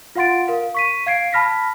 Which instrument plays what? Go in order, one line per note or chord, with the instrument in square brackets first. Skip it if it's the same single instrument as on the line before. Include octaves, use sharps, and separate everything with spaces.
[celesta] F4 F5 F#5 C6 A6 D7
A#4 F5
C#6 B6 D#7
F5 G#6 C7 D7
A5 B5 F6 A#6 B6